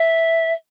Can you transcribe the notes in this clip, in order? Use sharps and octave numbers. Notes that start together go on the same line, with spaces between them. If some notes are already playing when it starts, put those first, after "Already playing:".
Already playing: E5